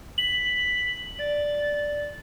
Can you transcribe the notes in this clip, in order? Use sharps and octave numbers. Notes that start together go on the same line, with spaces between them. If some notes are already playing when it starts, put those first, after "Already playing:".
B6 F#7
D5 A6